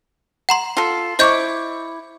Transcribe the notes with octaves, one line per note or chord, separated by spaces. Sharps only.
F#5 A#5 C6
F4 A4
E4 C5 D#5 C#6 D6 G6